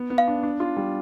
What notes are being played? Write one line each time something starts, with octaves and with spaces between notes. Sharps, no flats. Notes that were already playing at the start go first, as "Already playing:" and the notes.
Already playing: B3
B3
F5
D4
D4
F4
G3